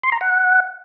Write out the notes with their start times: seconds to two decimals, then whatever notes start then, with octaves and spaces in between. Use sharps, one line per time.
0.03 C6
0.12 A#5
0.21 F#5